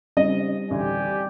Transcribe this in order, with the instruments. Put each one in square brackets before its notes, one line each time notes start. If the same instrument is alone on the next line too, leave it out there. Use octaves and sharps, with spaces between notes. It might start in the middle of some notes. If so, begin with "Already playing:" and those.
[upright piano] C#3 [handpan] G3 C4 D#4 [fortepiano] D#5
[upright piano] A1 D2 [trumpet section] G4 D5 G#5